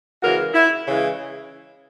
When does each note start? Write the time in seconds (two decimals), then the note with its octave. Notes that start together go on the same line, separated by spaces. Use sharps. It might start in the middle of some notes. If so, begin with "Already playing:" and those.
0.22 C#3 E3 G#3 F#4 A#4
0.54 E4
0.86 C#3 E3 G#3